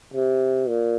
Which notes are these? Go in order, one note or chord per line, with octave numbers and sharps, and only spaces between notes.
C3
A#2